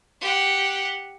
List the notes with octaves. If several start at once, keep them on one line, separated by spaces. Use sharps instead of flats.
G4 F#5